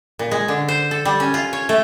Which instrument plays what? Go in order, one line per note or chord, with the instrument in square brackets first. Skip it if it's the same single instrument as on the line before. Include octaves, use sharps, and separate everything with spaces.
[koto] A#2
G#3
D3
C5
A4
G3
C#4
F4
C#5
A3